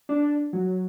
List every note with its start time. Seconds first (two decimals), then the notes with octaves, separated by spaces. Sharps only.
0.09 D4
0.53 F#3